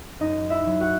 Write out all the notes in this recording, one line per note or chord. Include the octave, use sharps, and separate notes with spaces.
F#2 D#4 D#5
F#3
E4 E5
F#3
F#4 F#5